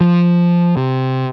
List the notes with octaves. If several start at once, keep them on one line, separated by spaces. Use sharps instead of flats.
F3
C3